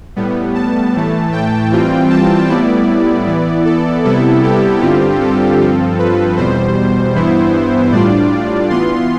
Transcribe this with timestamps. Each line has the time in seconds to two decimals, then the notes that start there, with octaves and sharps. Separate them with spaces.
0.16 A2 G3 B3
0.55 A5
0.93 A2 E3 A3
1.33 G5
1.71 E3 G3 C4 F4
2.10 A5
2.49 A2 G3 B3 E4 D5
3.26 E3 B3 E4
3.65 A4
4.04 C3 G3 B3 E4 A4
4.43 G4
4.81 G2 D3 G3 C4 F4
5.20 A4
5.60 G2 F3 C4 F4
5.99 B4
6.37 E2 B2 G3 C5
7.15 G2 E3 B3 E4
7.92 A2 G3 D4 F4 D5
8.70 E3 B3 F4 C6